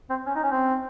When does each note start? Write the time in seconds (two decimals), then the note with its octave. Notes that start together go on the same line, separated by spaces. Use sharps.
0.09 C4
0.26 C#4
0.35 D#4
0.43 C#4
0.51 C4